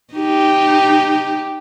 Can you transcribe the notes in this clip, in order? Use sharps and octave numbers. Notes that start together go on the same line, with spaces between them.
D#4 G4